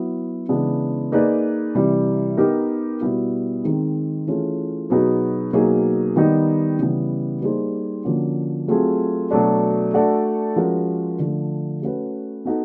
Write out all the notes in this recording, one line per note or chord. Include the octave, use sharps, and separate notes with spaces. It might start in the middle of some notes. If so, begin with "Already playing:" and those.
Already playing: F#3 B3 E4
C#3 E3 G#3 B3 D4
A#3 D#4 G#4 B4 D5
C3 E3 G3
B3 D#4 G4 A#4
B2 G3 B3 E4
D#3 G#3 C4 D#4
E3 A3 C#4 F4 G#4
B2 F#3 B3 D#4 G#4
B2 F#3 A#3 D#4 G#4
D#3 G3 B3 D#4
C#3 E3 G3 B3
G3 A#3 D#4 G#4 C5
D3 F3 A#3 C#4 F#4
F#3 A3 C4 F4 G#4
B2 F#3 A3 D4
A3 D4 F#4 A4 D5
F3 G#3 C#4 F#4 A#4
D3 F3 A3
A3 C#4 F#4 B4
B3 D#4 F#4 A4